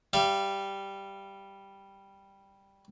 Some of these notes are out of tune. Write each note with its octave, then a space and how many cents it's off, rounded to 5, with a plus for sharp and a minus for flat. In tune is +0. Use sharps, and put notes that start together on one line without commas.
G3 +0 F5 -45